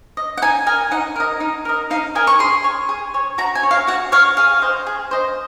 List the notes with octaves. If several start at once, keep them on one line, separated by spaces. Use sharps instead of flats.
D#5
F#5
D#4 G#5
A#4 D#5 G#5
D#4 F#5
A#4 D#5
D#4
A#4 D#5
D#4 F5
A#4 D#5 G#5
C#6
G#4 C6
C#5
G#4
C#5
F#4 A#5
G#5
C#5
F5
F#4 F#5
C#5 F5
G#4 F5
C5 D#5
G#4
C5 D#5